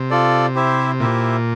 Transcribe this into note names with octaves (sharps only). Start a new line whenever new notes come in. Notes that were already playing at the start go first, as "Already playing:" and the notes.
Already playing: C3
F4 A4 D5
E4 G4 C5 E5
A#2 E4 G4 C5 E5